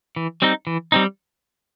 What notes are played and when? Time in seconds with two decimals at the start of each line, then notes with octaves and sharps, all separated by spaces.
0.16 E3
0.42 G3 C4 D#4
0.67 E3
0.92 G3 C4 D#4